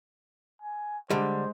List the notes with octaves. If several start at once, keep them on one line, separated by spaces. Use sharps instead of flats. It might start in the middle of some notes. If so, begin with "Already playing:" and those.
G#5
D3 G3 G#3 C5